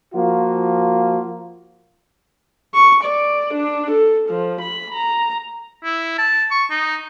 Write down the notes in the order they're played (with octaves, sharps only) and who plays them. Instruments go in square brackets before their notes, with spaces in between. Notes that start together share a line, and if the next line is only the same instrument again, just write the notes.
[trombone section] F3 A#3 F4 F#4
[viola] C#6
D5
D4
A4
F3
B5
A#5
[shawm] E4
A5
C#6
D#4